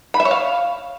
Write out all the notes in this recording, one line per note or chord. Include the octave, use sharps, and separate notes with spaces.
B5
E5
C#5
F5